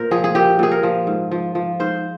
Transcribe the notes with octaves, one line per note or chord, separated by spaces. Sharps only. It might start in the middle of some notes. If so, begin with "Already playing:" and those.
Already playing: A#2 A#4 C5
F3 G#4
G#4
A#2 G4
A#2 G#4
A#4
F3
G#2
F3
F3
G#2 C5